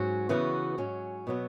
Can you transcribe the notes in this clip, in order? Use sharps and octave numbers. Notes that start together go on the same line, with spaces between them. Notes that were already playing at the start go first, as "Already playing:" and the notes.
Already playing: G#2 F#3 C#4 F#4
C#3 E3 B3 F#4
G#2 F#3 C#4
B2 F#3 B3